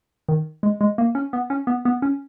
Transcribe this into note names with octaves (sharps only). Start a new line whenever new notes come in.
D#3
G#3
G#3
A#3
C#4
B3
C#4
B3
B3
C#4